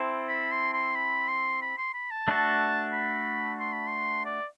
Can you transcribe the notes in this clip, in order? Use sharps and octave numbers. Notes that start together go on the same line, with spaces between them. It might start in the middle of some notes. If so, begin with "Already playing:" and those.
Already playing: C4 E4 A4 C5
B5
C6
C6
B5
C6
B5
C6
B5
A5
A3 D4 F#4 A4
B5
C6
B5
C6
D5